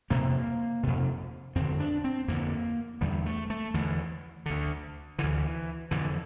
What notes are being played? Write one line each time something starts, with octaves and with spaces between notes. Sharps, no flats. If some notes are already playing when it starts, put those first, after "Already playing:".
F2 C3 A#3
F2 C3
F2 D3 C4
D4
C4
F2 D3 A#3
E2 D3 G3
A3
A3
E2 D3 E3
D2 D3
D2 D3 E3
F2 D3 E3